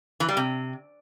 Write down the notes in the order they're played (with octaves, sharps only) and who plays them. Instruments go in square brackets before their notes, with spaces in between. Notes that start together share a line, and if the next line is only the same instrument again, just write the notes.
[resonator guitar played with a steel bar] E3
G3
C3